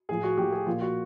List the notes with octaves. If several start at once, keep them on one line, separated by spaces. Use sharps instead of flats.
A2 F3 G#4
F#4
A2 F3 G4
G#4
A#2 F3 F4
F#4